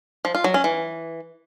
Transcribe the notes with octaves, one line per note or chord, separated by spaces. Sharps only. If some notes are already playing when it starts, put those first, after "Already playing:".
F3
F4
F#3
C#4
E3